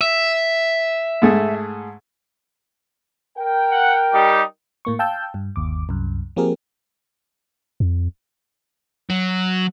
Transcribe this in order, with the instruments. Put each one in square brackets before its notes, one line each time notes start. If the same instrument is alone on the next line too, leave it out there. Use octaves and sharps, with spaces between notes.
[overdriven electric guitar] E5
[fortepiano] G#2 A3 G#4
[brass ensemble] A#4 G5
[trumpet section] F#5
G3 D#4 G4
[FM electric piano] A2 A#3 C#6
F5 G5 A5 E6 G6
G2
G1 D#2 D6
C2 F#2
F3 A#3 C4 G4 G#4 A#4
[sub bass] F2
[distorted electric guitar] F#3